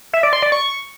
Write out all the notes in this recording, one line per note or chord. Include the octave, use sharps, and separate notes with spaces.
E5
D5
C6
D5
C#6